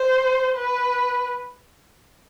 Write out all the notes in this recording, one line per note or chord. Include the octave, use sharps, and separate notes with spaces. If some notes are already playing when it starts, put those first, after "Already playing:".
Already playing: C5
B4